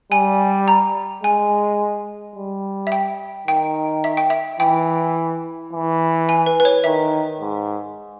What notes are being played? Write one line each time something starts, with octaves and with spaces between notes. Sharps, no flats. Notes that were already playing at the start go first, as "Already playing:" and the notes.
G3 G#5
A#5
G#3 G#5
G3
E5
G5
D#3 G5
E5
G5
E5
E3 G5
E3
G#5
B4
B4
C#5
D#3 E5
G#2